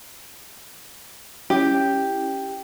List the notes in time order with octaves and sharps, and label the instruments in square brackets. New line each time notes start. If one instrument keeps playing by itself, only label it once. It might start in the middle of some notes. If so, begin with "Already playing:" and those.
[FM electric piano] C#4 E4 [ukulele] G4